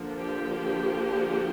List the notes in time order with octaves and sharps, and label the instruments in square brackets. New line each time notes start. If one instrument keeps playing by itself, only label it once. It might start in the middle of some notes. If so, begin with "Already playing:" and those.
Already playing: [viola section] D3 F3 A#3
G4